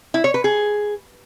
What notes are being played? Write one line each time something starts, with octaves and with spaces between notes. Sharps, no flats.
E4
C#5
B4
G#4